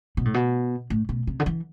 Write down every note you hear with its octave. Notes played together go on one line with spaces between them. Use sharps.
B2
A2
B2
A2
B2
C3
D3
E3